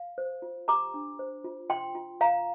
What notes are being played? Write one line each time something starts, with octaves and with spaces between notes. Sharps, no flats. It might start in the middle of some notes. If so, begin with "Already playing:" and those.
Already playing: F5
C5
F4
G4 A#5 D6
D4
C5
F4
F4 G5 C6
F4
F4 F5 A#5